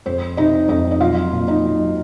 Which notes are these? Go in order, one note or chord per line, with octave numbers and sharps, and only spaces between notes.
F2 C5
C3 D#4 D#5
F2 D#4 D#5
D#5
F#3 F4 F5
A#2
D#4 D#5
F#3